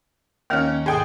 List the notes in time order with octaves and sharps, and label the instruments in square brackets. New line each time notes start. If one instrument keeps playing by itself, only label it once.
[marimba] D#2 D#3 F6 [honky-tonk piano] A#3 C#4
[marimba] G#2 B2 [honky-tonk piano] G#4 A4 G5